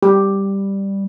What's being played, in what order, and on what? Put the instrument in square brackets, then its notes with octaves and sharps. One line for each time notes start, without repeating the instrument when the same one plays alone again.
[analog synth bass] G3 [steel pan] G4